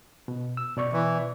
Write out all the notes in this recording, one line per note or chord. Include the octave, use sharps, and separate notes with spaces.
B2
E6
B2 D5 C#6
E3